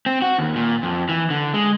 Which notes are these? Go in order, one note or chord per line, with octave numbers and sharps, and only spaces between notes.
C4
F#4
D#2
A#2
F2
E3
D3
G#3